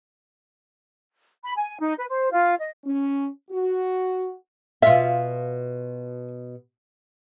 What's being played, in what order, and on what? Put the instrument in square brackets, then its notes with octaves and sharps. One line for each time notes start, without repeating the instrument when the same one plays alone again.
[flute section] B5
G#5
D#4
B4
C5
F4
D#5
[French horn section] C#4
F#4
[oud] B2 F4 [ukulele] E5